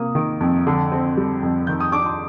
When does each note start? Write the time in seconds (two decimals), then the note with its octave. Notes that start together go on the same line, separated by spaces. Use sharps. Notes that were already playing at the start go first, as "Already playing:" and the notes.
Already playing: C3 A#3 D#6
0.15 D#3
0.40 F2
0.67 D3
0.92 C4
1.17 G3
1.43 F2
1.67 D#3 G6
1.80 D#6
1.92 D4 D6
2.06 C6